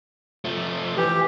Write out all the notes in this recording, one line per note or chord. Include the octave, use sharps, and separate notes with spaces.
F3 A3
E3 G4